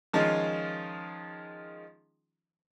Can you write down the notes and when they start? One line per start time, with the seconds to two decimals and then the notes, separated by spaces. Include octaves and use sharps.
0.13 D#3 F3 G#3 C#4 D#4 F4